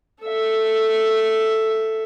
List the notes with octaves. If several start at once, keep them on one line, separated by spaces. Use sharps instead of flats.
A4 E5